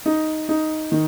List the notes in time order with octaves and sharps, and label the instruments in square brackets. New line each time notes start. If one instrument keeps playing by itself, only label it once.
[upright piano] D#4
D#4
D#3